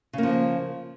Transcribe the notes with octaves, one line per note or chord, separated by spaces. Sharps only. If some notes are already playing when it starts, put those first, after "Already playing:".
C#3 F3 A#3